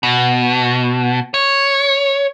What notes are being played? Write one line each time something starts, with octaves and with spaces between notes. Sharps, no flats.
B2
C#5